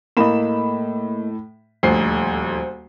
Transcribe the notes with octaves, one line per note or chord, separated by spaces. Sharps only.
A2 A#3 D#5 B5 E7
D#1 D2 F3 C5 C7